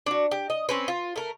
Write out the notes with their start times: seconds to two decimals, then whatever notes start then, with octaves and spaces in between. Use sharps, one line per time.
0.06 D4 F#4
0.31 G4
0.50 D#5
0.69 C4 C#4 B4
0.88 F4
1.16 A3 A#4